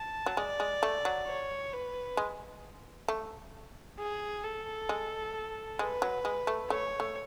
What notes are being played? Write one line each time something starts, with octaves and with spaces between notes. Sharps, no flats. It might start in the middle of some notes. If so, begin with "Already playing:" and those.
Already playing: A5
F#3
G#3 D5
G#3
A3
F#3
C#5
B4
G#3
A3
G#4
A4
G#3
G#3 B4
F#3
G#3
A3
A3 C#5
A3